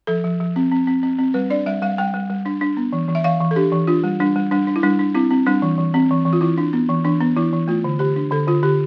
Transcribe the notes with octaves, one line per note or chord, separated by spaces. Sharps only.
F3 A4
F3
F3
C4
C4
C4
C4
C4
G3 B4
D4 D5
G3 E5
G3 F5
G3 G5
G3
G3
D4
D4
B3
E3
E3
E5
E3 F5
E3
A4
D4 G4
E3
D4 F4
G3
G3 D4
G3
G3 D4
D4
E4
G3 D4
D4
C4 E4
C4
G3 D4
E3
E3
C4
E3
E3
F4
E3 E4
D4
B3
E3
E3 D4
B3
E3 E4
E3
A3 F4
D3
D3 G4
D4
D3 A4
D3 F4
D3 G4